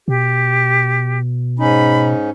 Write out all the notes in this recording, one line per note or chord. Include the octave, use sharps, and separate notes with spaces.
B2 G4
G#2 C#4 D#4 B5